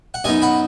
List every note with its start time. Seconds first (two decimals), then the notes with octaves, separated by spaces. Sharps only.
0.14 F#5
0.24 F#2 F#3 B3 D#4 D#5 G#5
0.42 F#5 B5